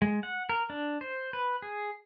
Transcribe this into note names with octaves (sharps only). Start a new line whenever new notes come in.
G#3
F#5
A#4
D4
C5
B4
G#4